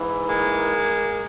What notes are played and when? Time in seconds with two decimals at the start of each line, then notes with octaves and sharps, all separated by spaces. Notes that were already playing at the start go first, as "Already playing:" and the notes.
Already playing: G#2 E3
0.28 G#3 A#3